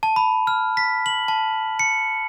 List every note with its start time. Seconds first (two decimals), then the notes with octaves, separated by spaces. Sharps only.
0.03 A5
0.16 B5
0.47 F6
0.77 B6
1.06 F#7
1.28 A5
1.79 C#7